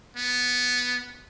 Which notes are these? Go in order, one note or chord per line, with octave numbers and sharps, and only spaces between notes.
B3